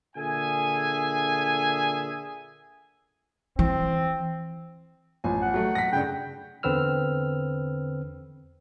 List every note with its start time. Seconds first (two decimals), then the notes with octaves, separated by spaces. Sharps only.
0.16 A#2 D3 G#4 E5 G#5
3.59 E3 C4
5.24 A1 F3 G#5
5.42 F#5
5.54 F#3 A3
5.75 A#6 B6
5.92 G2 C#3 G5
6.63 E2 D3 C4 B4 E6 F6